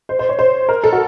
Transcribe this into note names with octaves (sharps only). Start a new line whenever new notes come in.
C5
C5
C#5
C5
A#4
A4
F#4